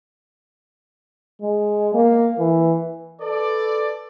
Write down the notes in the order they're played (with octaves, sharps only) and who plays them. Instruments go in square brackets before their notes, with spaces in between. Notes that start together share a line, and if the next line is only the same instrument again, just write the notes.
[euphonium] G#3
A#3
E3
[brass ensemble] A4 B4 D5